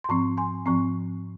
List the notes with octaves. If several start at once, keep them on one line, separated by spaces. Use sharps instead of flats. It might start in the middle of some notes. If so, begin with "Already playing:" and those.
C6
G#2 F3 C4 A#5 C#6
G#5 C6
G#2 F3 C4 A#5 C#6